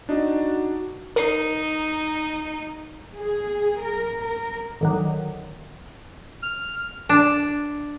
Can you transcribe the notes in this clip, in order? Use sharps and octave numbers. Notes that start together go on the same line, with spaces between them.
D4 D#4 F#4 D#5
D#4 A#4 C7
G#4
A#4
A#4
D3 D#3 F#3
F6
D4